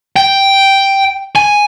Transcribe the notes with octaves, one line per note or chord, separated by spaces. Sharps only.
G5
G#5